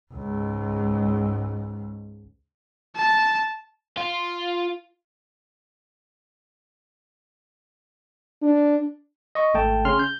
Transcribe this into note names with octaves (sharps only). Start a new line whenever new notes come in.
C#2 G#2
A5
F4
D4
D#5 C#6
G#1 A3 G5 A5
C#3 C#4 C6 F6
G6